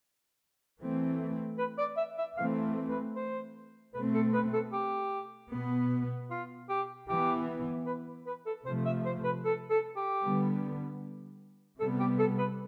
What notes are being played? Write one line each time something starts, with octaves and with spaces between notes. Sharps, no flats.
E3 A3 C4
B4
D5
E5
E5
E3 A3 C4 F5
B4
C5
B2 A3 C4 B4
A4
B4
A4
G4
B2 B3
F4
G4
E3 B3 G4
B4
B4
A4
C3 F3 A3 C5
E5
C5
B4
A4
A4
G4
D3 G3 B3
C3 G3 B3 A4
G4
A4
B4